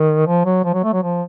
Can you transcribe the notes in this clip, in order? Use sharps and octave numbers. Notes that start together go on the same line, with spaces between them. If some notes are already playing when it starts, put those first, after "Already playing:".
Already playing: D#3
F3
F#3
F3
F#3
A3
F#3
F3